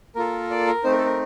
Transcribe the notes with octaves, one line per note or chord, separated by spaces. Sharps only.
A#3 F4 A4 A#4
D5
A#4
A3 C4 D#4 C5
A#4
A4
A#4